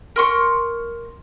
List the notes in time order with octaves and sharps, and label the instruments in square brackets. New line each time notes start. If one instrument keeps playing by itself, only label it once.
[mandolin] A#4 C6 C#6